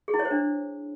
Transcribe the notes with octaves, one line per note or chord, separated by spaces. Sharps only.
G#4
E4
C#5
C5
D4